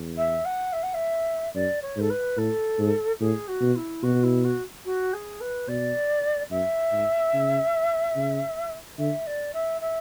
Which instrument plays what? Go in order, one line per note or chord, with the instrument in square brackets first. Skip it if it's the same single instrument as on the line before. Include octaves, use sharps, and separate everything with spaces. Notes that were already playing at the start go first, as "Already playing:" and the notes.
Already playing: [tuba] E2
[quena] E5
F#5
E5
F#5
E5
[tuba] F#2 [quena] D5
[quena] C#5
[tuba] G#2 [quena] A4
[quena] B4
[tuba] A2 [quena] A4
[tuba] G#2
[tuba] A2 [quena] G#4
[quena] F#4
[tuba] B2
[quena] E4
[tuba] B2 [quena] F#4
[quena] E4
F#4
F#4
G#4
B4
[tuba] B2 [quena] D5
[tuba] F#2 [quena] E5
[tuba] G#2
C#3
C#3
[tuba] D3 [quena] E5
[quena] D5
E5
E5